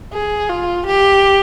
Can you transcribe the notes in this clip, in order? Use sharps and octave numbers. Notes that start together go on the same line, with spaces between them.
G#4
F4
G4